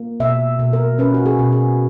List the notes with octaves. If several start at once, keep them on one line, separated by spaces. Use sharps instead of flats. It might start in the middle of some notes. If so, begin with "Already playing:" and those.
Already playing: A#3
B2 E5
B2
A#4
C#4 B4
F#4
G#4
B2
G#4